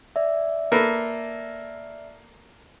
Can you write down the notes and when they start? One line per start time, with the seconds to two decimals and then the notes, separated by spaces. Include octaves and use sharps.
0.16 D5 E5
0.72 A#3 A4 B4